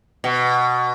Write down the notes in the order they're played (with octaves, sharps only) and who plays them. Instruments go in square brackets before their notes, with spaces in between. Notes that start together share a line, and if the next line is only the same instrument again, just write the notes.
[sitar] B2